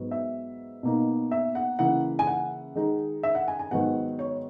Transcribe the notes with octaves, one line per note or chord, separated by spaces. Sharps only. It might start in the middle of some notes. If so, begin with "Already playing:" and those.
Already playing: G#2 F#3 B3
E5
B2 A#3 D#4
E5
F#5
C#3 E3 A#3 E4 F#5
G#5
F#5
D#3 G#3 D#4
E5
F#5
G#5
G#5
G#2 D#3 F#3 B3 F#5
C#5